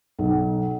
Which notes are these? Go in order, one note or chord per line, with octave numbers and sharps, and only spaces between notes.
B1